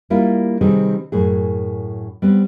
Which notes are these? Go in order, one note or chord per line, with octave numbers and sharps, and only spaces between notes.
G3 A#3 E4 F4
C3 D#3 G3 C4 G#4 B4
F#2 A2 G#4
G3 B3 C4